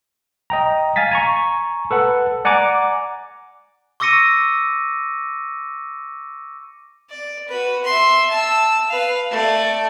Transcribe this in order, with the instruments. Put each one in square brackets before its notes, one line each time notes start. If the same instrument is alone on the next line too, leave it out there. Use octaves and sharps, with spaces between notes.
[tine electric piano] D#5 G5 A#5
F5 G#5 A6 B6
G#5 A#5 C#6
A4 B4 F#5
D5 F#5 G#5 A#5 D6
[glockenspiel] C#6 D6 E6 A#6 C#7 D#7
[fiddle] D5
F#4 B4
E5 C6
A5 E6
B4 F5
A3 D5